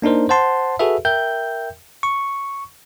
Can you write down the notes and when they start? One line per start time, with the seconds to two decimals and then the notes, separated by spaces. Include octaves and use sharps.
0.02 A#3 D4 D#4 A#4 C5
0.29 C5 F#5 A5 C6
0.79 F#4 G#4 A4 B4 E5
1.05 A#4 E5 G5 G6
2.03 C#6